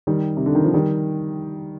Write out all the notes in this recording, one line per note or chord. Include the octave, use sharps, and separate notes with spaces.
D#3 G3
C3
D3
D#3
F3
D#3 G3